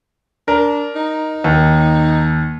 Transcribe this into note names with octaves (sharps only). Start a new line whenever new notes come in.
D4 A#4
D#4
D#2